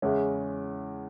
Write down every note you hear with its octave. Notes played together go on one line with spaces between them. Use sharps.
E2 C#3 G#3 C#4 E4